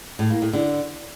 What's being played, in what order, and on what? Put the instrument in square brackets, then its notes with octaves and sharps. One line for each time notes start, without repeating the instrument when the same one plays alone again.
[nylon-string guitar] A2
A#3
A2
D3